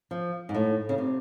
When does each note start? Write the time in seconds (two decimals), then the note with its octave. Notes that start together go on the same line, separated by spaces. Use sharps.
0.11 F3
0.49 G#2
0.55 A2
0.89 C#3
0.98 C3